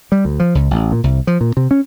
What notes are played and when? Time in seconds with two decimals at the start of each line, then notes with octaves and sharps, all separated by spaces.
0.12 G3
0.25 D2
0.40 F3
0.55 C#2
0.71 A1
0.92 A#2
1.04 C2
1.27 F3
1.41 A#2
1.57 C3
1.71 C#4